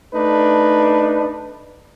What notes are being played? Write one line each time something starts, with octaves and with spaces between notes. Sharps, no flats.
A3 D4 D#4 B4